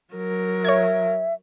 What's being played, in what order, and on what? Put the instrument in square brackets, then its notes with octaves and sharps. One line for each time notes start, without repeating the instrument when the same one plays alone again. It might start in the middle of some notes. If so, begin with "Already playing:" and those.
[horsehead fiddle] F#3 A#4
[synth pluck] C#5 G#6 [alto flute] E5